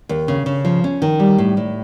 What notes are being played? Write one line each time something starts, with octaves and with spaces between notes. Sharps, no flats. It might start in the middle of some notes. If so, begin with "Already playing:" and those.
D#2
C#3
C#3
F3
C#4
D#3
G3
A2
A2